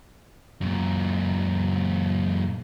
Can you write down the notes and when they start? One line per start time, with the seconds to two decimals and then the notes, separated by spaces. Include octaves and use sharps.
0.61 F#2 A#2